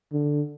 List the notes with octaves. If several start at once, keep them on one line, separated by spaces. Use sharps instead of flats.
D3